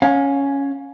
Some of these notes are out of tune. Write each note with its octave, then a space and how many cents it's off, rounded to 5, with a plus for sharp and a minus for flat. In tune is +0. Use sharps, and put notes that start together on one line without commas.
C#4 +0 F5 +35